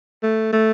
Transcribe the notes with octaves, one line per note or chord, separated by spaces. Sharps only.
A3
A3